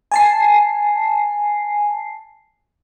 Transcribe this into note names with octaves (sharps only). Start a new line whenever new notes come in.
G#5 A5 C7